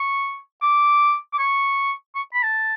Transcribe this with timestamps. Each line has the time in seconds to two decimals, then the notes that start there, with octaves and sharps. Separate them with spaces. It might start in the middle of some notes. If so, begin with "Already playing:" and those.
Already playing: C#6
0.62 D6
1.33 D6
1.39 C#6
2.15 C#6
2.34 B5
2.43 A5